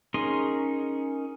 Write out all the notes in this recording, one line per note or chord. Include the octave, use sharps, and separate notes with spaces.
C#4 D#4 G#4 A#4 C6